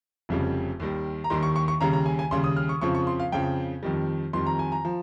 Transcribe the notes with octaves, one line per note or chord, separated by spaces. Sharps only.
F1 F2 C#3 G3
D#2 D#3 G3
A#5
D#2 D#3 G3 C6
C#6
C#6
C#6
D#2 C#3 G3 A#5
A#5
G#5
G#5
D#2 C#3 G3 C6
D#6
F6
C#6
F2 C#3 F3 C#6
C#6
C6
F5
F2 C#3 F3 G5
F2 D#3 G3
F2 D#3 G3 C6
A#5
G#5
A#5
F3